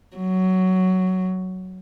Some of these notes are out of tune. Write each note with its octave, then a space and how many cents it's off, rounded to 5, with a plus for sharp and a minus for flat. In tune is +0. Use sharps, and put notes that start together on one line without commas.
F#3 +10